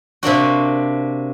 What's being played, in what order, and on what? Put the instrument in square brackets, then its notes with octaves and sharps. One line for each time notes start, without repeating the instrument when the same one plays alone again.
[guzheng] C3 A#3 D4 F#4